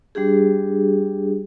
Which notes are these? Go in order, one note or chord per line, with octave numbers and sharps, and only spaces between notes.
G3 D4 G4 G#4